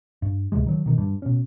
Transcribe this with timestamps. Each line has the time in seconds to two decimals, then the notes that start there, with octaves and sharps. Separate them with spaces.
0.22 G2
0.52 D2 A2 C3 G#3
0.67 D#3 F#3
0.86 B2 D#3
0.98 G2
1.22 B2 C#4